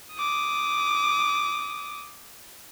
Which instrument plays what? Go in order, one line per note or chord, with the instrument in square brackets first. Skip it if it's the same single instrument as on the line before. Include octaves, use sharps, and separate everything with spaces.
[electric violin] D6 D#6